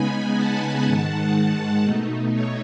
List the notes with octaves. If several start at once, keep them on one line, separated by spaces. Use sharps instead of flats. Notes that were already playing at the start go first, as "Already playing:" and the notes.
Already playing: C#3 G#3 B3 D#4 G#5 B5
F#5 A5
G#2 D#3 G#3
B2 A3 D#4
C#5